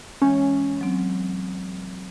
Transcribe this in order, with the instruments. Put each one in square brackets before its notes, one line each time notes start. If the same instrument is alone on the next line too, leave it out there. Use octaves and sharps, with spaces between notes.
[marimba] E3 G#3 [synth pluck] C#4
[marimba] F#3 C4